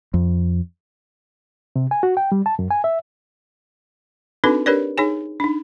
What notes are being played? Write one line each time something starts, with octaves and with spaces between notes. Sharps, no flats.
F2
C3
G#5
F#4
G5
G3
A5
F#2
G#5
E5
C4 D4 D#4 F#4 A4 B4
D4 G4 A#4 B4 C#5 D5
D#4 G#4 C#5 G#5
D4 D#4